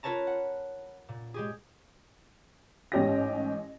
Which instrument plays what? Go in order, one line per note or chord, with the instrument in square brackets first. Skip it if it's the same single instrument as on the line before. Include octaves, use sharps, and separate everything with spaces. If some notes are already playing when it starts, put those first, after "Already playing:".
[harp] F4 A#4 B4 C#5 A5 A#5
F#5
A#2
G#3 G4 G#4
[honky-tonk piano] A1 G#2 C#4 G4 G5 A#6